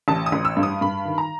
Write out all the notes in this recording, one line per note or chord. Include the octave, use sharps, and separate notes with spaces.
A1 A5
D#6
A1
E6
G2
D#6
G2 B5
D#3
A#5